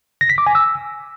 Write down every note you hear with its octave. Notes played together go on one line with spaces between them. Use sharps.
A#6
B6
D6
G#5
E6